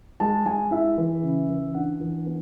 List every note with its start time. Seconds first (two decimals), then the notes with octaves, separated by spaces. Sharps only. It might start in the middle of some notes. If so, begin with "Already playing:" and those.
0.20 G#3 A5
0.45 G#3 G#5
0.71 E4 E5
0.97 E3
1.23 C#3
1.49 E3
1.74 D4 F#5
2.00 E3
2.26 B3